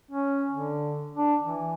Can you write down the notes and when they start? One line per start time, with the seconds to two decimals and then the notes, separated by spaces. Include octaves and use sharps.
0.11 C#4
0.51 D3
1.16 D4
1.42 E3